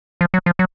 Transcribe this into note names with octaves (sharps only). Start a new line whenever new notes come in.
F3
F#3
F3
F#3